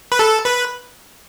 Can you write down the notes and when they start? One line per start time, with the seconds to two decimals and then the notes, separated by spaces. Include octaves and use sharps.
0.12 B4
0.19 A4
0.45 B4